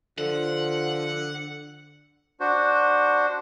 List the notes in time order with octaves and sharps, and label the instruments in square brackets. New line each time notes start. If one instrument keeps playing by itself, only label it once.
[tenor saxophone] D3 [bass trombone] F3 [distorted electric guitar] F#5
[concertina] D4 F#4 C5